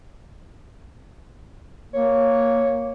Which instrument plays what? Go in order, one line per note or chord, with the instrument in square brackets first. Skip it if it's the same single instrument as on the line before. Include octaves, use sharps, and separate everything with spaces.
[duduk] A#3 [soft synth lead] C#5